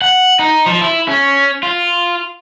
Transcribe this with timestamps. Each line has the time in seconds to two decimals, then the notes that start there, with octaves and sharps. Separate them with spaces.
0.02 F#5
0.39 D#4
0.66 F3
0.81 E4
1.08 C#4
1.63 F4